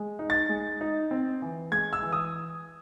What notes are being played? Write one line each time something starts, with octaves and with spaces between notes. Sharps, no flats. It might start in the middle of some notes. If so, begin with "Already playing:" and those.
Already playing: G#3
D#4
A6
G#3
D#4
C4
E3
G#3 G#6
E6
E3
D#6